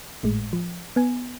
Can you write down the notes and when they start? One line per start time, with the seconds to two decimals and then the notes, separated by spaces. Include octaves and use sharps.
0.23 G#1 A2 G#3
0.53 F3
0.96 B3 G#5